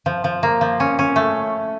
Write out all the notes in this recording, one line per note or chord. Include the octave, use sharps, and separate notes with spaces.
F3
F3
A#3
F3
C#4
C#4
A3